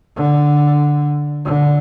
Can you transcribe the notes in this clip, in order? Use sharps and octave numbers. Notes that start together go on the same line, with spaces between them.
D3
D3